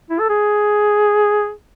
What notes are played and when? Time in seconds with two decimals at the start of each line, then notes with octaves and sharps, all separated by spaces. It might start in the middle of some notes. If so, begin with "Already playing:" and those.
0.10 E4
0.20 A4
0.29 G#4